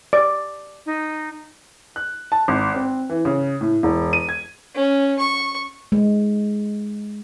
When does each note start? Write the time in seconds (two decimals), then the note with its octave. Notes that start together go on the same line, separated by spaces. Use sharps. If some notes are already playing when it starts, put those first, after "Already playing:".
0.13 D5
0.86 D#4
1.96 F#6
2.32 A5
2.48 G#1
2.74 C4
3.09 E3
3.25 C#3
3.61 A2
3.83 E1
4.13 D#7
4.29 G#6
4.75 C#4
5.19 C#6
5.92 G#3